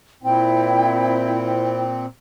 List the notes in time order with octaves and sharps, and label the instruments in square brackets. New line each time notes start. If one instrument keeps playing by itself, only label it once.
[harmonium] A#2 C4 [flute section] E4 G5